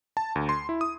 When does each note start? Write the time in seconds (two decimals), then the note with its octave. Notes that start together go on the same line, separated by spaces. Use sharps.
0.17 A5
0.35 D2
0.49 C6
0.69 E4
0.81 D#6